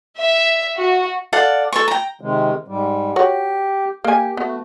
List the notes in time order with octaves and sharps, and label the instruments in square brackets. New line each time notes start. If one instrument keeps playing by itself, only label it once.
[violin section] E5
F#4
[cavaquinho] A4 D5 F5 F#5
A4 B4 C#6
G5 A#5
[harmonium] C3 D#3 G#3
G#2 G3
[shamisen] F#4 C#5 [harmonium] G4
[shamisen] A#3 G#5 [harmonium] G4
[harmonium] A3 F#4 [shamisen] B3